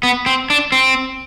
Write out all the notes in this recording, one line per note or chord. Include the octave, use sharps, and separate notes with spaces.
B3
C4
D4
C4